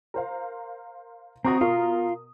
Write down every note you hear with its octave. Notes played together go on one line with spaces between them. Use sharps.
A#4 C5 F5
C4 F#4 A#5 C#6 D#6
B2 F4 A#4